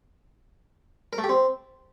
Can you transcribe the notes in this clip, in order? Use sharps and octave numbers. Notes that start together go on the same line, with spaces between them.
A#4
A3
G4
C4